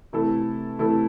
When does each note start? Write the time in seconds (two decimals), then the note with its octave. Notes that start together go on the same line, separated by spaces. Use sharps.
0.13 C3 E3 A3 E4 A4
0.78 C3 E3 A3 E4 A4